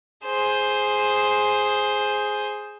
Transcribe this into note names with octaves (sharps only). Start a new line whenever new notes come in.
G#4 C5